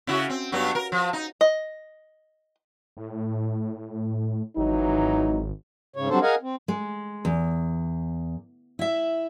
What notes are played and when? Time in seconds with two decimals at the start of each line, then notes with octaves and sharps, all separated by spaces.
0.07 C#3 E4 F#4
0.30 C4
0.52 G2 F#3 B3
0.75 A#4
0.92 F3
1.13 D#4
1.41 D#5
2.97 A2
4.57 G#1 E3 F#3 D#4
5.96 G#2 C#3 C#5
6.09 F#3 G3 C4 D4 A4 C5
6.22 G#4 A#4 D#5 F5 F#5 G#5
6.42 C4
6.68 G#3
7.25 E2
8.79 E4 E5